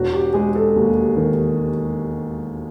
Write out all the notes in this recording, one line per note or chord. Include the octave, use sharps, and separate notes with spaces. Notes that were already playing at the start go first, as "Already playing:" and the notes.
Already playing: E1 F#4
G4
G#3 G#4
A4
D#2
D#3